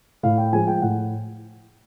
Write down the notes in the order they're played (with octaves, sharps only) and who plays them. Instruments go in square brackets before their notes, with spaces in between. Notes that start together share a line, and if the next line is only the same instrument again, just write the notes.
[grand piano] A2 F5
G5
F3 G#3 G#5
G5
A2 F#5